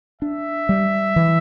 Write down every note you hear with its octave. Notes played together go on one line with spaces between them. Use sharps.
D4 E5
G3
E3